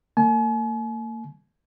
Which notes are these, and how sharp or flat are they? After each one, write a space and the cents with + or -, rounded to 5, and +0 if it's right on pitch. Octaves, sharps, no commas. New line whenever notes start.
A#3 -40 G#5 +45